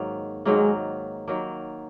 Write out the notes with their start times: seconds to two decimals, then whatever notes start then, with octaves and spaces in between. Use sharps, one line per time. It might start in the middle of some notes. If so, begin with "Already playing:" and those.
Already playing: G#2 D#3 F#3 A#3
0.45 G#2 D#3 F#3 G#3 A#3
1.28 D#3 F#3 A#3